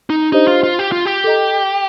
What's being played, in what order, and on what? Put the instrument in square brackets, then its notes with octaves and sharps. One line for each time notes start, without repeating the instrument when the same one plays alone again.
[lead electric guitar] D#4
[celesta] D4 G4 C5 D#5 [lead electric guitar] D#4
[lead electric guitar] F4
F4
G4
F4
G4
[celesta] A4 D#5 A#5